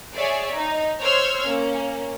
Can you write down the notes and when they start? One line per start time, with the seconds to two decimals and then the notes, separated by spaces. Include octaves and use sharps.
0.16 G#4 C#5 D5 E5 G#5
0.53 D#4
1.01 C5 C#5 C6 E6 F6 G#6
1.47 A#3 C#4